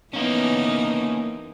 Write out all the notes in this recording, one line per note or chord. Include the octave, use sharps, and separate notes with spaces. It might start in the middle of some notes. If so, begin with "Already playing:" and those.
E3 A#3 B3 C#4 D#4